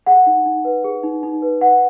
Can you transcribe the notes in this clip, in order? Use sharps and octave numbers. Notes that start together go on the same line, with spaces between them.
G#4 F#5
D#4
D#4
B4
G#4
D#4
D#4
B4
B4 F#5